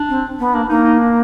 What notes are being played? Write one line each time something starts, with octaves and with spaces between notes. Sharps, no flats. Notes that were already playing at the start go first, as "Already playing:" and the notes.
Already playing: D4
C4
B3
A#3 D4
A#3 D#4
D#4
D4